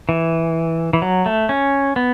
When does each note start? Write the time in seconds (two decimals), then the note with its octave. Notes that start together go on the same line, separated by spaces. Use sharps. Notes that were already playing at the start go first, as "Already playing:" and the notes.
0.09 E3
0.93 E3
1.02 F#3
1.26 A3
1.49 C#4
1.96 B3